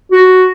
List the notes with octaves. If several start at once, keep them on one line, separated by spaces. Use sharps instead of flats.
F#4